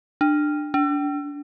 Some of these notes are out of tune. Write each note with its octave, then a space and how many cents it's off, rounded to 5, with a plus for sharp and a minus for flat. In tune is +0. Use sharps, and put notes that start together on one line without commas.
D4 +25
D4 -25